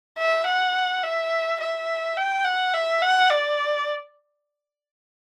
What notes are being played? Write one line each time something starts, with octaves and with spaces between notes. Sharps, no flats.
E5
F#5
E5
E5
G5
F#5
E5
F#5
D5